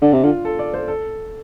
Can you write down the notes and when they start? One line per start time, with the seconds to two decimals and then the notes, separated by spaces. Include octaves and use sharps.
0.02 D3 D4
0.13 C3
0.24 D3 F4
0.45 A4
0.59 D5
0.74 C5
0.88 A4